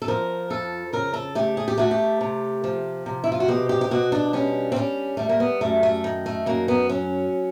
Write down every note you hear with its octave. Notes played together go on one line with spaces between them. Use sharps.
A4
F3 A#4
F2 A4
C#3 A#4
A4
A3 G4
G#4
G4
A3 F#4
G4
C3
F3
C3
E4
F4
F#4
B2 G4
G4
G4
B2 F#4
D4
G3 C#4
C4
G3 C#4
G3 A3
A#3
B3
F#2 A3
A3
D#3
A3
F#2 A#3
B3
F#3 C#4